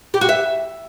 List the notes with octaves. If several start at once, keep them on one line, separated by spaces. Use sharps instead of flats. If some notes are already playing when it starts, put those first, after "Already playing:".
G4
F#4
E5